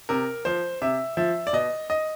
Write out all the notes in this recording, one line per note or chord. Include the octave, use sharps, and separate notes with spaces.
C3 A#4
F3 C5
C3 E5
F3 E5
D5
B2 D#5
D#5